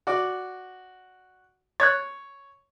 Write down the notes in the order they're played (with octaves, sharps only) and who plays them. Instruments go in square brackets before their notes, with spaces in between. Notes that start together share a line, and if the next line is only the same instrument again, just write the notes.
[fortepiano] F#4 D5
[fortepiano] C#5 [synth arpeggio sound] F#6 G#6 A6